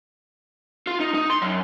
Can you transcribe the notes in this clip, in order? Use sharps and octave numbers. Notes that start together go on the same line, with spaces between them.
F4
D#4
D#4
C6
F#2